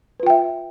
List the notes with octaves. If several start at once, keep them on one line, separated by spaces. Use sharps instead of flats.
F4 B4 E5 G5